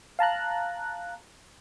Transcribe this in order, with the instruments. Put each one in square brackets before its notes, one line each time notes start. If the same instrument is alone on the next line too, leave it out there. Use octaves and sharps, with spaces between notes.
[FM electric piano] F5 A5 A#5 F#6